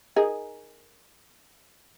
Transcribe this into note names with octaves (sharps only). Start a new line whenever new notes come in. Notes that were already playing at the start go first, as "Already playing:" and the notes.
D#4 G#4 A#4